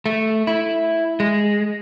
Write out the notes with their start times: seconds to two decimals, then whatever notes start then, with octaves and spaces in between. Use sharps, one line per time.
0.06 A3
0.47 E4
1.20 G#3